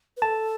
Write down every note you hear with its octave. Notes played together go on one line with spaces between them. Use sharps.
B4
A4 A5